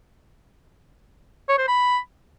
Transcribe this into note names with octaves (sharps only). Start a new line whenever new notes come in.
C#5
C5
B5